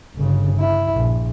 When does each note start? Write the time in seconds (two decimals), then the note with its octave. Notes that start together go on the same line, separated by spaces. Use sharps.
0.16 G1 C#3
0.60 E4
0.94 A#1